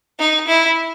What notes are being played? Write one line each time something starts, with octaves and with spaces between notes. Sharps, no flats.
D#4
E4